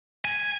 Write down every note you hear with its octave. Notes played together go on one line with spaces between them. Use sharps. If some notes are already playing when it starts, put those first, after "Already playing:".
G#5